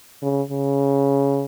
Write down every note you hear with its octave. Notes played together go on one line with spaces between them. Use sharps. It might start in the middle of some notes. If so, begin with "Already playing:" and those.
C#3
C#3